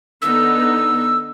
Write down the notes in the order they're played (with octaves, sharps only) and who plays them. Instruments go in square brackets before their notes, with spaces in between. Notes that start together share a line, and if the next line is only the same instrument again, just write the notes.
[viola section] D3 B3 D#4 [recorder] E6